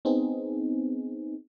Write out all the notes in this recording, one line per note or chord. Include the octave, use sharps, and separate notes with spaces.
B3 C4 D#4 G#4